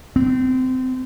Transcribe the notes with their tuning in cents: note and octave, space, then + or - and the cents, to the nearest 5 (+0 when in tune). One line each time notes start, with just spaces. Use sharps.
C4 -25